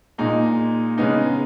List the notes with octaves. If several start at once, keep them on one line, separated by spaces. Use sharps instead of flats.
A#2 G#3 D#4
C#3 G#3 B3 D#4